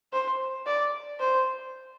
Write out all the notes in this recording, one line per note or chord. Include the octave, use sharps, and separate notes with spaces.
C5
D5
C5